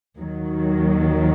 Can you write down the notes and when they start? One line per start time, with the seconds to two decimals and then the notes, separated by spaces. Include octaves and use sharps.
0.18 D#2 D#3 F#3